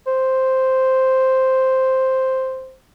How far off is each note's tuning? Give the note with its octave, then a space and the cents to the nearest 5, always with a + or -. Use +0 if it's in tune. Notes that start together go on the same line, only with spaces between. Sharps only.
C5 +0